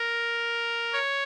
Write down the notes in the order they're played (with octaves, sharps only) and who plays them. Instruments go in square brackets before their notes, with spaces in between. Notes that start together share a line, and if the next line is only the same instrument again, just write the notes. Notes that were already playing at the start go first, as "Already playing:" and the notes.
Already playing: [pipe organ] A#4
C#5